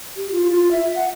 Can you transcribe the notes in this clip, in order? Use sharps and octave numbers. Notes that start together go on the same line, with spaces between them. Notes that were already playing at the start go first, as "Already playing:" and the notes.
G4
F4
F4
E5
F#5